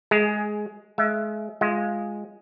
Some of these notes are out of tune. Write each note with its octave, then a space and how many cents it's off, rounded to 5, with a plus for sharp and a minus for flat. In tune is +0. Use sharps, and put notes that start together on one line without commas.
G#3 +15 G#4 +5
G#3 +35 E5 +30
G#3 +0 F4 +0 D#5 +10